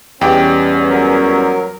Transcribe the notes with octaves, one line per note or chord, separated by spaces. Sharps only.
E2 G3 B3 C#4 G4 D#5 G5
F#3 A#4